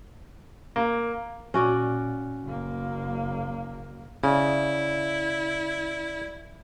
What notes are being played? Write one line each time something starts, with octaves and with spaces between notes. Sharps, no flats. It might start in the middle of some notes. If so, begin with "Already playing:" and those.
A#3
A#2 C#4 F#4 D5
F#1 A#3
C#3 E4 D5 E5